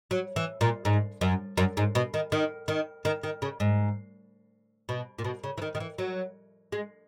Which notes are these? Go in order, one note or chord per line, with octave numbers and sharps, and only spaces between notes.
F#3
E3
A#2
G#2
F#2
F#2
G#2
B2
D#3
D#3
D#3
D#3
D#3
C#3
G#2
B2
A#2
B2
C#3
E3
D#3
D#3
E3
F#3
G#3